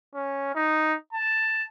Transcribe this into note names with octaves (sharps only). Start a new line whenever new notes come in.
C#4
D#4
A5